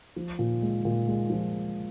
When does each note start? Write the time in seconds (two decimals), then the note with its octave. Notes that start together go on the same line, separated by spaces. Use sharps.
0.16 F3
0.39 A#2
0.62 G#3
0.85 A#2
1.08 G#3
1.30 F3